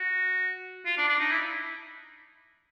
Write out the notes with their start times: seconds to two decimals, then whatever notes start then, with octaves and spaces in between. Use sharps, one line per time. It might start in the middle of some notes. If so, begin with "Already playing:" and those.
Already playing: F#4
0.86 F4
0.98 D4
1.08 D4
1.19 D#4
1.31 E4